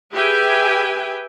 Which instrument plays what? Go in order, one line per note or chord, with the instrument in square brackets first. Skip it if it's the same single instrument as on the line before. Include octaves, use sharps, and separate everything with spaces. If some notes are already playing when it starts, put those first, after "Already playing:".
[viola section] G4 G#4 B4 E5 G5 G#5